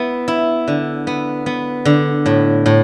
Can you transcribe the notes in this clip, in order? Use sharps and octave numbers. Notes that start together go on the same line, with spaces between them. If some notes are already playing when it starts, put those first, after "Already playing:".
Already playing: B3 E4
E4
D3
B3
B3
D3
A2
A2